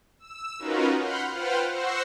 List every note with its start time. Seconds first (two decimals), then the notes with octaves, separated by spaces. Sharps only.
0.19 E6
0.59 C#4 D#4 F4 F#4 A#4 B4
0.97 F#5 B5 C6 F6 G6
1.31 F4 B4 C5 F#5 G5 F6
1.70 C5 F#5 C#6 E6 A#6 C7